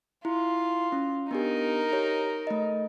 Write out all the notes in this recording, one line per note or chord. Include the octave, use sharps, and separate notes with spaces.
E4 F4
C#4
B3 D4 D#4 G4 A#4
G4 C#5
A3 D#5